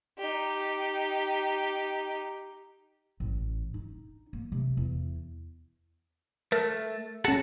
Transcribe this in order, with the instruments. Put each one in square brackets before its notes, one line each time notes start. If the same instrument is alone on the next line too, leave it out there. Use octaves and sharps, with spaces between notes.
[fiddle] D#4 G4
[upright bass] A1
D#4
A#3
C3
E2
[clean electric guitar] A3 [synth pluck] A#4
[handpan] C#4 G#4 [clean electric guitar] F#4 A4 F#5